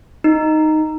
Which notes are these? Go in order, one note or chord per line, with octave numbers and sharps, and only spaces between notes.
D#4